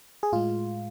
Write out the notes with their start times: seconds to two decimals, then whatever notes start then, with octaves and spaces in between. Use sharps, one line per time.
0.23 G#4
0.33 A2 G#3 F4